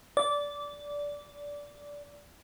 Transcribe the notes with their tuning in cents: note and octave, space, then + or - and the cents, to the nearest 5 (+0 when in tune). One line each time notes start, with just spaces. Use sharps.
D5 -15